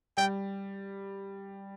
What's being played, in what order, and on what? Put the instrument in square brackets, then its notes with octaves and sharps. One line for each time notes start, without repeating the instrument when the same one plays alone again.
[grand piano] G3 [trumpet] G5